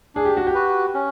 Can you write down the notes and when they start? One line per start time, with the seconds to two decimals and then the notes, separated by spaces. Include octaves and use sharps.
0.15 D4 G#4
0.25 G4
0.37 F#4
0.47 G4
0.54 F#4 B4
0.94 C#4